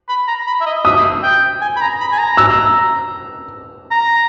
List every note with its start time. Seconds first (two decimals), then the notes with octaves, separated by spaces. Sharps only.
0.09 B5
0.27 A#5
0.47 B5
0.61 E5
0.66 D#5
0.84 E5 D#6
1.23 G5
1.61 G#5
1.76 B5
1.81 A#5
2.00 B5
2.12 G#5
2.18 A#5
2.37 E6
3.91 A#5